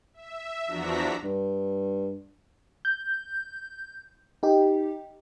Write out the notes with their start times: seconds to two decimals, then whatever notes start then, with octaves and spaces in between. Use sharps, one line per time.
0.14 E5
0.67 E2 F3 D4 F#4 A#5 B6
1.24 G2
2.85 G6
4.43 D#4 G4